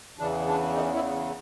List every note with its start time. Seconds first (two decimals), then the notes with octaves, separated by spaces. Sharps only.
0.19 E2 C#3 E3 D4
0.47 D4
0.75 D#3 D#4
0.95 E3 E4